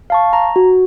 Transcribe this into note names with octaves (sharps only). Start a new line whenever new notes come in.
F5 A5 C#6
A#5
F#4